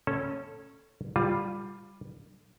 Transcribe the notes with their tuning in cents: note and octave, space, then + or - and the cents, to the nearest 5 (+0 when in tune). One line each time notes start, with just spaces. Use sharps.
C#4 -10 A4 +0
G3 +10 F4 +0